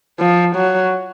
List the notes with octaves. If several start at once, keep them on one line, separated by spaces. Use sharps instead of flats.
F3
F#3